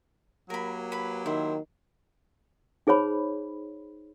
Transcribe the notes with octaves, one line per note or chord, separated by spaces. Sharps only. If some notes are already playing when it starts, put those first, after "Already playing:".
F#3 A#3 G4 A#4 B5
B4 B5
D#3 E4 C5 E5
D#4 G#4 C5 C#5 B5